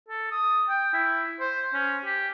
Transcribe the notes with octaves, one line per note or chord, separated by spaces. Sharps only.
A4
D#6
G5
E4
C5
C#4
G4